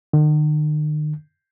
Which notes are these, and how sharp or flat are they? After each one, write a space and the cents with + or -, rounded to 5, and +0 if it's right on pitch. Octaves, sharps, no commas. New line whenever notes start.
D#3 -45